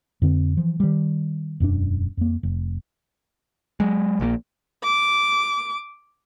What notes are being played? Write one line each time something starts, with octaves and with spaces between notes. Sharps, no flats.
F2 D3 C4
E3 F3
D#3 G3
E1 F#2 F3 D4
F2 A#3
F1
F#3 G#3
A#1 A#2 D#3 A#3
D6